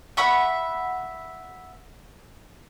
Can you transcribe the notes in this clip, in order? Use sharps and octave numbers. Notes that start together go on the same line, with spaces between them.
E5 F#5 B5 C#6